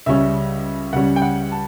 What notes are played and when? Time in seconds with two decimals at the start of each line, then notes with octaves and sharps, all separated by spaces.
0.06 C#2 C#3 G3 C#4 E5
0.93 C#2 C#3 G3 C#4 F#5
1.16 G5
1.22 F#5
1.52 A5